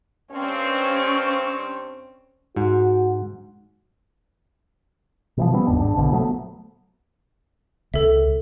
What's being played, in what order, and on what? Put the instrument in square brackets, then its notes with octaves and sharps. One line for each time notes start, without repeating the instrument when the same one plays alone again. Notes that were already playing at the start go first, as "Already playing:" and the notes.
[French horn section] G2 C4 [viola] C#4 C#6
[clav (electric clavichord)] G#2 [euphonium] F#4
[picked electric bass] B2 E3 F3
C#3 G3 B3 C4
F#1 D#2 G#2 D4
G#2 D4
F1 A#1 B2 D3
F3 F#3 A3 B3
[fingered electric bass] C#2 [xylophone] A4 E5